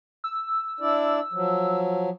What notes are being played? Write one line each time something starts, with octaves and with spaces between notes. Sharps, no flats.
E6
D4 E4 D5
F3 F#3